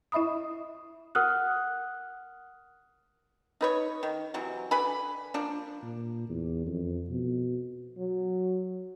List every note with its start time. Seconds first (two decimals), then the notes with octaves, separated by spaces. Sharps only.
0.12 E4 D#5 E5 B5 D#6
1.15 A#4 F#5 D#6 F6 F#6
3.61 D#4 B4 C#5
4.03 D#3
4.34 C3 E3 F#3
4.71 D3 B4 G#5 B5
5.34 F3 A#3 D4
5.83 A#2
6.29 E2
6.67 F2
7.10 B2
7.98 F#3